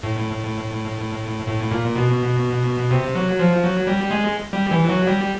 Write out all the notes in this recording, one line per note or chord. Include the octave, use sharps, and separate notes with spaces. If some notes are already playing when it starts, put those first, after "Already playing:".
A2
A2
A#2
B2
C3
F#3
F3
F#3
G3
G#3
G3
E3
F#3
G3